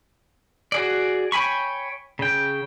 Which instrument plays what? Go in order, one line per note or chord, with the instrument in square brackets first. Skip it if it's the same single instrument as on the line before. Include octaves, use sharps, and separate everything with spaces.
[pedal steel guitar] F#4 G#4 D5
C#5 G5 G#5 B5 C#6
C#3 G5